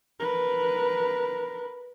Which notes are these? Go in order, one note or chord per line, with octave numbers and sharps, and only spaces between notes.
A#4 B4